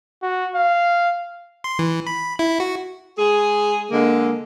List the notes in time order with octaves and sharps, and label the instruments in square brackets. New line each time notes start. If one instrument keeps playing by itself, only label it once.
[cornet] F#4
F5
[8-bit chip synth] C6
E3
B5
E4
F#4
[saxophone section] G#3 G#4
D3 G#3 A#3